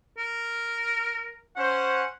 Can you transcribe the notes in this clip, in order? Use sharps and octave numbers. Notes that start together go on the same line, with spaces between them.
A#4
C#4 C5 F#5